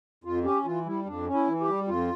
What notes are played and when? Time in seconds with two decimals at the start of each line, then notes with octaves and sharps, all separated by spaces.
0.24 F2 F4
0.44 C#4 G4
0.65 E3 F4
0.86 G3 E4
1.06 F2 D4
1.26 C#4
1.34 E4
1.48 E3
1.61 G4
1.68 G3
1.88 F2 F4